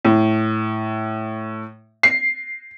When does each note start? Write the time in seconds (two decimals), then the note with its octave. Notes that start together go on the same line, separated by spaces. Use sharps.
0.05 A2
2.03 C7